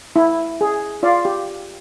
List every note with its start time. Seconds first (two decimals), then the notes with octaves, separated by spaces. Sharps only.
0.16 E4
0.61 G#4
1.03 F4 D5 F5
1.25 G4